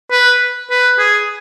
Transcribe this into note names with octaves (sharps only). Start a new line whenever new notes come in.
B4
B4
G#4